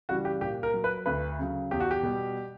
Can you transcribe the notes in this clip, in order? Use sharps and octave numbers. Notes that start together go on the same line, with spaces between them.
C#3 E3 G3 F#4
G4
A#2 G4
A#4
F#3
B4
D2 B4
C#3 F#3
E2 G4
F#4
G4
B2 G3